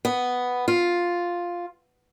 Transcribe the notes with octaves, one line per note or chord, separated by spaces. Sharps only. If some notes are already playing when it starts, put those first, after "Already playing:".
B3
F4